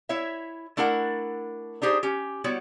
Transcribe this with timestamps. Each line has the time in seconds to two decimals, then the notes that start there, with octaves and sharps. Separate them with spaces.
0.09 E4 C#5 E5
0.77 A3 D4 E4 A#4 F#5
1.82 D4 D#4 G4 G#4 C5
2.03 C#4 G4
2.44 G3 B3 E4 F#4 C#5